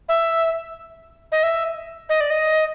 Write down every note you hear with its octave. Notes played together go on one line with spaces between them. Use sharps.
E5
D#5
E5
D#5
D5
D#5